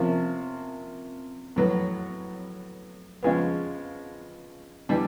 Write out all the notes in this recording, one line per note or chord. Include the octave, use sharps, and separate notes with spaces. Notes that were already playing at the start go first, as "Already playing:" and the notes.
Already playing: C3 F3 A#3 C#4
A2 F#3 B3
C#3 F3 G#3 B3
E3 G3 B3 D4